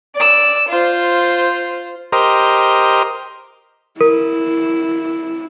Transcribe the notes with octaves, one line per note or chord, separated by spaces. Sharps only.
D5 E6
F4 C5
G4 A#4 C5 D#5
E4 A#4